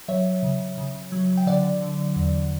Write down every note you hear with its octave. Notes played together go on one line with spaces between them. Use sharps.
F#3 C#5 E5
C#3
C#3
F#3
G5
D3 D5 F#5
D3
E2